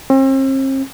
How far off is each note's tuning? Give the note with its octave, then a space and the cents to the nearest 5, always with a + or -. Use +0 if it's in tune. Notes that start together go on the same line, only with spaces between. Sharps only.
C4 +40